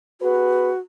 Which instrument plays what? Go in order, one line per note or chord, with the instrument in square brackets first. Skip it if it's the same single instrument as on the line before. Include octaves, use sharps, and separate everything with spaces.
[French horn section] B3 G#4 B4 [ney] F#4